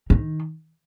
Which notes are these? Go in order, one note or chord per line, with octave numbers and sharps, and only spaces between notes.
D#3